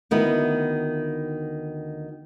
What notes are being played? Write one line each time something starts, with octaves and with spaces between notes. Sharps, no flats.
D2 D#3 B3 E4